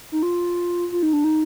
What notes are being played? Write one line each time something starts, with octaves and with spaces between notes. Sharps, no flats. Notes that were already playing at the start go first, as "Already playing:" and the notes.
D#4
F4
F4
D#4
D4
D#4